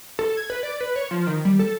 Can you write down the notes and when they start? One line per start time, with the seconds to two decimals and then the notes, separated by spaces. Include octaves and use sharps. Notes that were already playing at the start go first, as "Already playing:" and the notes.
0.19 A4
0.37 G#6
0.50 B4
0.63 D5
0.81 B4
0.96 C#5
1.11 F3
1.27 D#3
1.45 G3
1.59 A4